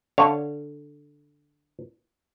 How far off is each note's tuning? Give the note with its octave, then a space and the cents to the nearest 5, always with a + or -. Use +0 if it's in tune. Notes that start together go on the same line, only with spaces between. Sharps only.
D3 +0 C#5 +0 F5 -25